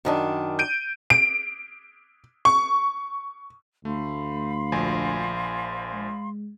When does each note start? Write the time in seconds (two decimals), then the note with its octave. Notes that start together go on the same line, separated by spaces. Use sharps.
0.05 F#2 D#3 D4
0.59 G6 D7 D#7
1.10 D7
2.45 C#6
3.85 D2 A3 F5 B5 C6
4.72 A#1 F3 G#5
5.94 G#3